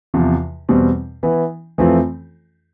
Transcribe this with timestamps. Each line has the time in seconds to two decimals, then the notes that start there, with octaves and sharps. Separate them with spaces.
0.14 E2 C3 F3
0.69 E2 B2 G3 C4
1.23 E3 B3 E4
1.78 F2 E3 A3 C4 F4